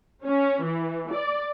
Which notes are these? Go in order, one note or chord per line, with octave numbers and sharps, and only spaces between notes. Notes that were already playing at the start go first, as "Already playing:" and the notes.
C#4
E3
D5